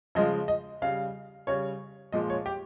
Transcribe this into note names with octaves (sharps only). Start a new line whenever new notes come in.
C#3 F3 G#3 D#5
D#5
C#3 G3 F5
C#3 G3 C#5
A#2 F3 G#3 D#5
C#5
G4